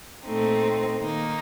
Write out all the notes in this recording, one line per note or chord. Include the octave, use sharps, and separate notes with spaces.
A#2 A3 C4 D#4
D#3 A#3 D#4 A#4